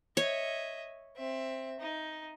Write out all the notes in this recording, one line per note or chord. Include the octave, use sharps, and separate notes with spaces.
C#5 D#5 E5
C4 E5
D#4